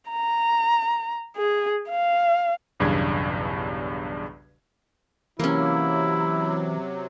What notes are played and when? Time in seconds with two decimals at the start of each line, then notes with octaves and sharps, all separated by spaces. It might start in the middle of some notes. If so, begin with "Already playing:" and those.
0.11 A#5
1.37 G#4
1.89 F5
2.80 B1 E2 G2 C#3 D4 G#6
5.39 C3 E3 F#3 A#3 C#4 E4